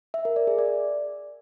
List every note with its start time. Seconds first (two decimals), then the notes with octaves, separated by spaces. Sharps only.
0.14 E5
0.25 A#4
0.36 D5
0.47 G#4
0.59 D5